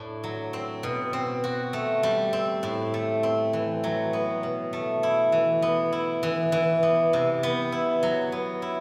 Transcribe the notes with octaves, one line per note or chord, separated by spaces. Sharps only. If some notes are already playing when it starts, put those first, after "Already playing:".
Already playing: A2 D4
F#3
C4
B2
C4
F#4
A3
G3
C4
A2
A3
C4
E3
F#3
B3
B2
A3
E4
E3
B3
E4
E3
E3
B3
C3
B3
E4
F#3
B3
E4